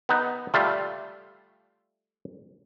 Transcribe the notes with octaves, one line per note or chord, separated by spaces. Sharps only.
B3 D#4
G3 A3 F4